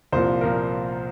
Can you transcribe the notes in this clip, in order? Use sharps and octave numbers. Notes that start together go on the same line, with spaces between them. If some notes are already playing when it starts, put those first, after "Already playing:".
C2 A#2 F3 C5
A#2 F3 A#4